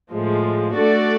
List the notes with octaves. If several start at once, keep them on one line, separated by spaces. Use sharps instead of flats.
A2 F3 G#3
A3 D4 F#4 A4 D5